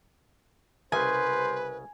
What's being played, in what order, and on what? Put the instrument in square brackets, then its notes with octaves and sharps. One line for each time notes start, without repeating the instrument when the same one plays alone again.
[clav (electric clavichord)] C2 C#3 [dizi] B4 [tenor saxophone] C5 [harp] G#5